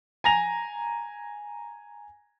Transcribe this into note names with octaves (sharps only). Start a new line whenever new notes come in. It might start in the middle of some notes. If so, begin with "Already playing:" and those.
G#5 A#5 A#6 F7